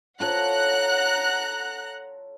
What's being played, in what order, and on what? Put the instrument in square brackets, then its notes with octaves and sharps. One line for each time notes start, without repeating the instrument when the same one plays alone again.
[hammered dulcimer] F4 A4 C#5 [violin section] F#5 A#5 F#6